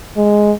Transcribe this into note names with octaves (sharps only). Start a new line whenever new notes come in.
G#3